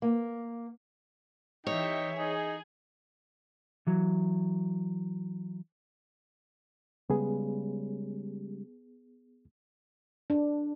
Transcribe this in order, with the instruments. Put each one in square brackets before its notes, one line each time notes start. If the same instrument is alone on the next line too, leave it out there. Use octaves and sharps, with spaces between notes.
[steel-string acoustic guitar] A#3
[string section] E3 G4 E5 [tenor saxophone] D#4 [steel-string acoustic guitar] C#5
[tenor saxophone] D#4 [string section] G#4
[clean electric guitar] E3 F#3
[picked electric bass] C#3 G3 G#3 [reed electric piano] B3 G#4
[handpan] D4